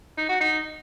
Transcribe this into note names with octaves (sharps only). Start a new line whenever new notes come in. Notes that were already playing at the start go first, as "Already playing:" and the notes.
D#4
F#4
D#4